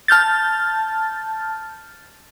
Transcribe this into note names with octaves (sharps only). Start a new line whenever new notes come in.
A5 F6 G6 A6